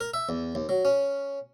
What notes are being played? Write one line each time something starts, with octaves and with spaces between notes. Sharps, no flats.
A#4
E5
E2
D#2
F#3
C#4